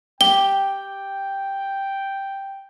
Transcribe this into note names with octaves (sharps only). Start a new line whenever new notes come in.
G4 G5 G7